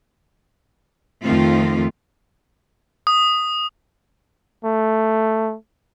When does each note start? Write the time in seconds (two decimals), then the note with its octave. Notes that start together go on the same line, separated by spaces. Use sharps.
1.23 F2 D#3 F3 A3 C4 F4
3.07 D#6
4.64 A3